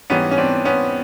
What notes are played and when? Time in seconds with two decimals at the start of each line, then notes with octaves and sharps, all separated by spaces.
0.10 G#2 E3 G3 B3 C#4
0.31 C#4
0.38 C4 D4
0.65 B3 C#4